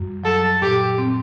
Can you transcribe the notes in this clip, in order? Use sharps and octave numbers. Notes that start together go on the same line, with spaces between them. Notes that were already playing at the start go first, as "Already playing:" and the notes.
Already playing: F#2 G3
F#3 A4
A#2 G4
C4